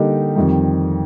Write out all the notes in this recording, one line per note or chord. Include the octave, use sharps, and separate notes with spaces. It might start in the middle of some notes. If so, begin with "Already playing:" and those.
Already playing: D3 G3 A#3 D#4 G4
F2 D#3 G3